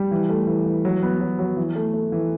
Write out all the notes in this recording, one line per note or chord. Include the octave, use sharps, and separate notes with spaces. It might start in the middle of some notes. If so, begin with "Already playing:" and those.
Already playing: G3
E3
A3
E3
E3
F#3
B3
F#3
F#3
E3
A3
A3
E3